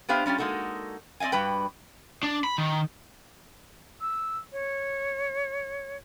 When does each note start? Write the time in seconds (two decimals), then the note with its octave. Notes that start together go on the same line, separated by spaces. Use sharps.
0.09 B3 D4 G4 C5 F5
0.26 G3 C#4 F4 G4
0.38 G#3 A#3 D#4 F#4 A4
1.20 C4 D5 D#5 F5 G#5
1.32 G2 G3 F#4 B4 G5
2.23 D4
2.44 B5
2.58 D#3
4.01 E6
4.53 C#5